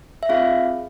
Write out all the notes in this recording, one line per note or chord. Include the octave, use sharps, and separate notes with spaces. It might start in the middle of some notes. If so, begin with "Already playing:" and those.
E5
C4 F4 G#4 F5